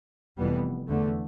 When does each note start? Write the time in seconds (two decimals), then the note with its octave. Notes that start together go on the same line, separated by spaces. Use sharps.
0.38 F1 F2 E3 G3 B3
0.87 E2 D3 A3